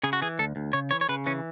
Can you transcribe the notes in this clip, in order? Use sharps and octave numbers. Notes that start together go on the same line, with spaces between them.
C#3 G#4
F#4
E3 G#4
D2 A4
D2
C#3 C#5
E3 C#5
C#5
C#3 B4
E3 C#4